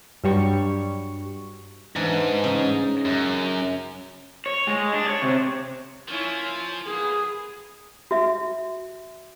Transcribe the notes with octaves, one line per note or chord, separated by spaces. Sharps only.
G2 F#3 G3 C#6
G#2 E3 D4
C#3 D#4
F#2
C#5
G#3
D4
C#5
C3
F3 A#3 C#4 E4
A#3 B3 G#4
F#4 E5